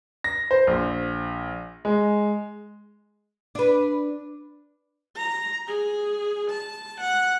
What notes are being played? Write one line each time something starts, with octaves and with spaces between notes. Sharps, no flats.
A#6
C5
A#1
G#3
D4 B4
A#5
G#4
A5
F#5